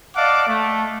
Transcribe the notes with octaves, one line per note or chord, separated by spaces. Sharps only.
D5 D#5 F5 F#5 A5 D6
A3